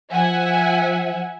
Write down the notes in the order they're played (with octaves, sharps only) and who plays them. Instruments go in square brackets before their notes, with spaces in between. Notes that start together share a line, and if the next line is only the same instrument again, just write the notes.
[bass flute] F3 [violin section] E5 F#5 G#5